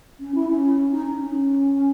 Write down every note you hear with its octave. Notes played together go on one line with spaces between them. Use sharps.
C#4
E4
C#4
D#4
D#4
C#4